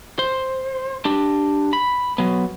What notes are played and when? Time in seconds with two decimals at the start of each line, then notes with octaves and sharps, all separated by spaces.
0.19 C5
1.05 D4 G4
1.73 B5
2.18 F#3 B3